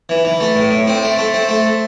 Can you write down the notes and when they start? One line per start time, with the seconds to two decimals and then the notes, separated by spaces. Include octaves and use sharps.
0.09 E3
0.25 E3
0.40 A3
0.55 A2
0.71 A2
0.87 C4
1.03 A3
1.18 A3
1.34 C4
1.49 A3